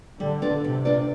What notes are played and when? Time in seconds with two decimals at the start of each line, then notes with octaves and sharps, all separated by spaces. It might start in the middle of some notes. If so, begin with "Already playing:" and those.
0.20 D3 G3
0.42 D4 F4 B4 D5
0.64 C3 G3
0.85 D4 F4 B4 D5